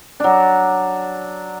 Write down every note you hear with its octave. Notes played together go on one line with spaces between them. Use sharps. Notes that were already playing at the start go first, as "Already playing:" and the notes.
F#3 D4